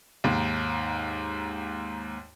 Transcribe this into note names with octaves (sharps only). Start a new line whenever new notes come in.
D#2 G#2